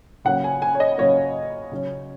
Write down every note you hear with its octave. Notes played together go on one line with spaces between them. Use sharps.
C#3 F#3 A#3 F#5
G#5
G#5
C#5
D#5
C#3 F#3 A#3 C#5
C#3 F#3 C#4